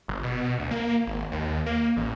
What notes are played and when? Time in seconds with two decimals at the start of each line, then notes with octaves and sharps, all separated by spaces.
0.08 G1
0.23 B2
0.58 D2
0.71 A#3
1.06 G#1
1.32 D#2
1.66 A#3
1.96 A1